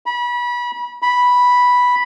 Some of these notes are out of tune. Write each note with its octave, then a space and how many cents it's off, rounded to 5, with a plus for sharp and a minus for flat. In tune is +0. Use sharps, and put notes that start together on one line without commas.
B5 -30
B5 -5